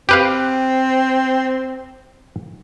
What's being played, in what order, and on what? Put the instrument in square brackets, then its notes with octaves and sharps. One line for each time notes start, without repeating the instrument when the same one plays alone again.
[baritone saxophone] C4 [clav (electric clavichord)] G4 B4 F5